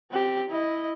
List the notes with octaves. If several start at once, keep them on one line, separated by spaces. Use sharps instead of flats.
C4 G4
E4 D#5